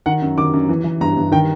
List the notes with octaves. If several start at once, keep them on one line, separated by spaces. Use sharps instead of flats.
D#3 F#5
F#2
D#3 D6
F#2
E3
E3
G2 A#5
G2
D#3 G5